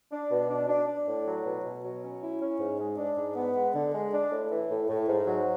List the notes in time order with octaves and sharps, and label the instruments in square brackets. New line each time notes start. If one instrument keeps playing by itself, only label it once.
[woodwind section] D4
B2
D4
D4
D4
A2
F#3
B2
B2
F#3
C#4
E4
C#4
G#2
G#3
D4
G#2
B3
G#3
D3
G#3
D4
A2
E3
A2
A2
G#2
F#3